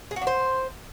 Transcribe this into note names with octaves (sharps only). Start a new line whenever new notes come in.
G#4
F#4
D4
C5